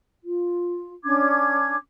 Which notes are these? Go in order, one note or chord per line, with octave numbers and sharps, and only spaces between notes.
F4
C#4 D4 D6 G#6